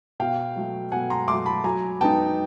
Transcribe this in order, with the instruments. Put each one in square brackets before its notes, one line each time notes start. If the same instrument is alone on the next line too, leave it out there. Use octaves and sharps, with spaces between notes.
[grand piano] B2 F5 G5
F#3 A3
B2 F#5 G#5
A#5 C6
F#3 A3 C6 D6
A5 B5
F#3 G#5 A#5
B3 D#4 G5 A5